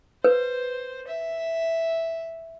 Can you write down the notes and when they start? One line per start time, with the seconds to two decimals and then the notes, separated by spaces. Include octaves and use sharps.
0.24 B4 C5
1.08 E5